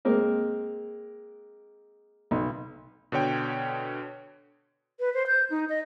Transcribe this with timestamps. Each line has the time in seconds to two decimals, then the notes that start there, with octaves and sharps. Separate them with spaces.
0.05 G#3 A#3 C4 A#4
2.31 B1
3.12 B2 D3 C#5 G5
5.00 B4
5.14 C5
5.27 G6
5.50 D#4
5.69 D#5